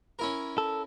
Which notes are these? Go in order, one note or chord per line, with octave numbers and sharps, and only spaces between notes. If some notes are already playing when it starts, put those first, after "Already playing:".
C#4 E4 A#4
A4